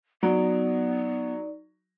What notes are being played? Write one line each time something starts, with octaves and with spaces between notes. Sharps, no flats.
F#3 B3 D#4 D5